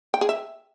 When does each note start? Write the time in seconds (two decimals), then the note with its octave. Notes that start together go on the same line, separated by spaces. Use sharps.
0.14 G5
0.21 G#4
0.29 E5